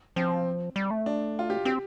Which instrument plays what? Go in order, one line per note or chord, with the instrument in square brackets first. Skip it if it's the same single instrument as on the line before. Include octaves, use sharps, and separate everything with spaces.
[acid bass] F3 [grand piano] C4
[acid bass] G3
A3
[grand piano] D4
F4
G4
[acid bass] C4 [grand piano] G4